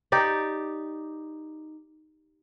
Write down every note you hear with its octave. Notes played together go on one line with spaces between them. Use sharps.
D#4 G4 D5